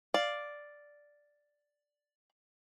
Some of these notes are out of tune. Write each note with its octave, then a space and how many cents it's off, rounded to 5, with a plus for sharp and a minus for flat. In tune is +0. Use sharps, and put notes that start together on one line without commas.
D5 +0 F5 +0